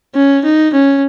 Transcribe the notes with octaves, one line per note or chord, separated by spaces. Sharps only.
C#4
D#4
C#4